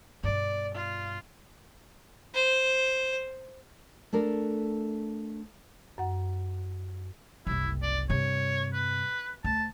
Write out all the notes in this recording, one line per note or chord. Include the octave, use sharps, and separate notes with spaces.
G2 B2 D5
F4
C5
A3 D4 A4 A#4
F#2 F#5
F#1 C2 E4
D5
G2 C3 C#5
B4
D2 A5